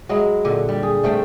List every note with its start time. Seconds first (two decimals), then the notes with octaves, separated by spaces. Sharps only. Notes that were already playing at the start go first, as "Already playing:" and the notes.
0.09 F#3 G#3 E4 G#4
0.45 A#2 D3
0.69 G3
0.83 G#4
1.03 G3 A3 C4 G5